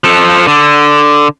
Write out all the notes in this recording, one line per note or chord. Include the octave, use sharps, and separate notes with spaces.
F3 A4
D3